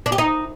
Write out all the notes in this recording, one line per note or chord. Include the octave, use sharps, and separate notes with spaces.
D4
G4
D#4